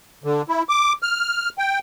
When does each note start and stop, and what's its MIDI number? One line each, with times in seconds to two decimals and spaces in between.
0.24 0.42 50
0.48 0.63 64
0.69 0.93 86
1.03 1.49 89
1.58 1.79 79